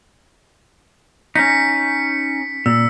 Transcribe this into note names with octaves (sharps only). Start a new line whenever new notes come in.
C#4 D#4 B6 C#7
A#2 E6